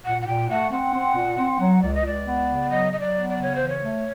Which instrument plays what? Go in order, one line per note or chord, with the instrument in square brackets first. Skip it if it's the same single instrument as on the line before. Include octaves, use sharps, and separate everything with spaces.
[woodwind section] A#2 [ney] F#5
[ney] F#5
[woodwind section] A#2 [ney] G5
[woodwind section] A3 [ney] F#5
[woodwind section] C4 [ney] F#5
[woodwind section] C4
A#2
C4
F#3
[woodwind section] C#2 [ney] D5
[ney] D#5
[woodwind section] C#2 [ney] D5
[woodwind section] B3
C#3
[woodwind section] F#3 [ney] D#5
[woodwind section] F#3 [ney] D#5
[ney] D5
[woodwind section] B3
[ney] D5
[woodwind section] C#3
[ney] C#5
[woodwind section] E3 [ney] C5
[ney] C#5
[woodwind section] A3